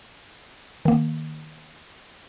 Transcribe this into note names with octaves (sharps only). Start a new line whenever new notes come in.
D#3 A#3